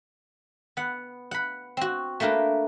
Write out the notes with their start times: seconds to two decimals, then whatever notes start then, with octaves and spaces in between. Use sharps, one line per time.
0.77 B3 F#5
1.31 F#5 B5
1.77 C4 F#4
2.20 A3 A#3 D4 A#4 B4